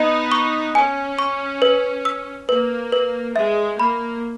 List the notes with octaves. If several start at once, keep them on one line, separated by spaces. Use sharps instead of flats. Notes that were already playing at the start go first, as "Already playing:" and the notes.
Already playing: B3 D#4 D#5
C#6
C#4 G#5
C#6
B4
E6
A#3 B4
B4
G#3 E5
A#3 B5